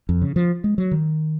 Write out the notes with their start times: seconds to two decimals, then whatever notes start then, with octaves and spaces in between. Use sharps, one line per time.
0.09 F2
0.22 C#3
0.36 F3
0.64 G#3
0.78 F#3
0.91 D#3